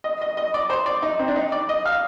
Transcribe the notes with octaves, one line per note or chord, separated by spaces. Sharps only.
D#5
D#5
D#5
D5
C5
D5
D#4
C4
D4
D#4
D5
D#5
F5